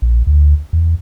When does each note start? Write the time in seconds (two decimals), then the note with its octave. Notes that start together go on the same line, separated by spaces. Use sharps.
0.02 A#1
0.27 D2
0.73 E2